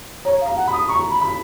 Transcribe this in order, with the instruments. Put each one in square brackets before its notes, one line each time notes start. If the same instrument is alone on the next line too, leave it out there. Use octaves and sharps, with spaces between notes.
[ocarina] C#5 [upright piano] A#5
[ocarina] F5
[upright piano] A#5
[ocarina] F#5
[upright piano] B5
[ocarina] D#6
[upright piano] A#5 [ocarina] C#6
[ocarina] B5
[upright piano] B5